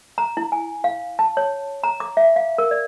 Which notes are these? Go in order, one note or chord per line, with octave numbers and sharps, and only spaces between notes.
A#5
E4
G#5
F5
A5
C#5
A#5
D6
E5
F5
A#4
D5